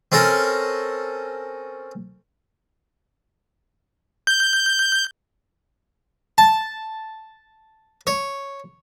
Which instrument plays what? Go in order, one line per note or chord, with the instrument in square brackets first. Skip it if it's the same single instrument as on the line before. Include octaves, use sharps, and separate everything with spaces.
[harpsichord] C4 C#4 A4 A#4
[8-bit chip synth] G6
[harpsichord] A5
C#5